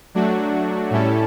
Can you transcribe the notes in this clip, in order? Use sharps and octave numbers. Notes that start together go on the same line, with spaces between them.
F#3 A3 D4 F#4
A2 G3 C#4 E4 A4